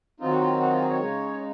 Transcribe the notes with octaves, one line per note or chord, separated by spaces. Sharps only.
D#3 F#3 C4 D#4 F4
F#4
F4
F#4
F4
G#4
C#5
C#3 G#3 D#4